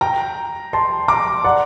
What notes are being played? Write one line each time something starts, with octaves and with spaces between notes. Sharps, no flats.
G5 A#5
A5 C6
A#5 D6
D5 F#5